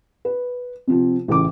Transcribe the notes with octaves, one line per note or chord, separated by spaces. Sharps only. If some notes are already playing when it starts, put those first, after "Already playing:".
B4
C3 F3 C4
A1 A2 C#3 D6